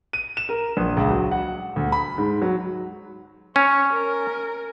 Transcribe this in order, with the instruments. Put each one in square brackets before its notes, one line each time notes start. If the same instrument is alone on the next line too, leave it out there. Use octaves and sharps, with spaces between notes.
[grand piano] D#7
E7
A#4
A#1
C#2
F#3
F#5
D2
B5
G#2
F#3
[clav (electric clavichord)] C#4 [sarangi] C#5
[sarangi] A#4